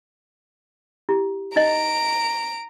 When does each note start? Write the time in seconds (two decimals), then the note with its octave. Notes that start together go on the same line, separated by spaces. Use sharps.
1.09 E4 G4
1.56 D#4 D#5 A#5 D7